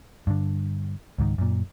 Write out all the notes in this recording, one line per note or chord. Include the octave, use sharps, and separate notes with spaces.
G2 D3
C#2 G#2 D#3
F#2 A#2